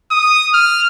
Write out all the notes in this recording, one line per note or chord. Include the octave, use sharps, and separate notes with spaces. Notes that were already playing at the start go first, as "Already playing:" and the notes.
D#6
F6